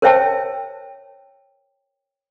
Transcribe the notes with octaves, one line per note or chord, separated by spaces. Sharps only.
A#4 C5 C#5 E5 G5 A5